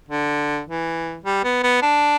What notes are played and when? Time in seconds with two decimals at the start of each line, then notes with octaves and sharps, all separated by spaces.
0.09 D3
0.67 E3
1.24 G3
1.44 B3
1.63 B3
1.82 D4